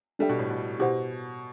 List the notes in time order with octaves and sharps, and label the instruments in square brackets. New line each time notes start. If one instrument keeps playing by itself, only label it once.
[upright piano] G3 [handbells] D4 A4 E5 G5
[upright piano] B2
A2
B2
[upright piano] B2 [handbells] E4 G4 C5 F#5